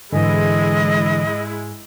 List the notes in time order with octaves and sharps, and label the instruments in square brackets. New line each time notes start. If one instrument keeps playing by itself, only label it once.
[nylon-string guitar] G#2 [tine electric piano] D3 E3 [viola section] G#3 E4 [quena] D#5